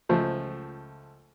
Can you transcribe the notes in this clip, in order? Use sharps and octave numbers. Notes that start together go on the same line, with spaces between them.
C#2 F3 A3